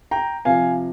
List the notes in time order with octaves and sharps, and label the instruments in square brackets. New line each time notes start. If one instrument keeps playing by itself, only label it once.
[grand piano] G5 A#5
C3 F3 F5 G#5